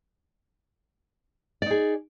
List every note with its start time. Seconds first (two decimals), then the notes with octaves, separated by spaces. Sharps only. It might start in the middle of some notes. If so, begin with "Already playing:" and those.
1.62 D5
1.66 D#4
1.71 G#4